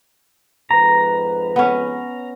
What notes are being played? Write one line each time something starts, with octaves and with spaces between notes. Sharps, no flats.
F2 G#2 B4 A#5
B3 C#4